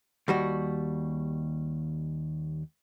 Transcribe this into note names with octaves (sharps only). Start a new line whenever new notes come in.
D#2 G3 F#4